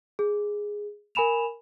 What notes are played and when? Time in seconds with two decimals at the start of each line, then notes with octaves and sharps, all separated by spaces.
0.19 G#4
1.15 A#4 G#5 B5 E7 F7